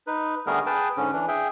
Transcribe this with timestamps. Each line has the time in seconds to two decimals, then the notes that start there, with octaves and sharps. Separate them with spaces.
0.07 D#4 B4
0.47 D3 G3 A3 B3 G#4 A#4
0.66 G#4 B4 G5 A5
0.97 G#2 D3 C#4
1.13 E3 D4
1.28 G#4 E5 G5